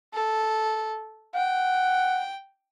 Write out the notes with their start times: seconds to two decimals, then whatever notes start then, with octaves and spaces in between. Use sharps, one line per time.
0.14 A4
1.35 F#5 G5